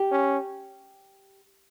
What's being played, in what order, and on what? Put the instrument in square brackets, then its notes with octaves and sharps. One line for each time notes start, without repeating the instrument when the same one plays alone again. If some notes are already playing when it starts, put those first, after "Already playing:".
Already playing: [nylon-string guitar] G4
[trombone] C#4